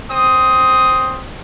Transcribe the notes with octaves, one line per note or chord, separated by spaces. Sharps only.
C4 D#6